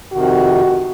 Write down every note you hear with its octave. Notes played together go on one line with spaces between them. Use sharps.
F2 C3 D#3 F#4